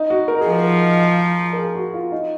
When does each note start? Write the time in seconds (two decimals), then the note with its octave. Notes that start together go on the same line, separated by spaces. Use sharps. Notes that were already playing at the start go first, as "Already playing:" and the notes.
Already playing: D#4
0.10 F#4
0.28 A#4
0.41 G#4
0.47 F3
0.53 A#4
1.53 A#4
1.57 G#4
1.76 F#4
1.94 F4
2.12 D#4